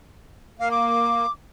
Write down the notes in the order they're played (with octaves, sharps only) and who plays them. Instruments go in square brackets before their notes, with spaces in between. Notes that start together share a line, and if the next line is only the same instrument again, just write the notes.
[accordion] A#3 [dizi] F5
[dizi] D6